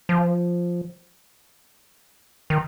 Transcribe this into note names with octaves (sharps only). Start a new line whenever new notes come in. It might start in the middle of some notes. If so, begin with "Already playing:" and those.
F3
D#3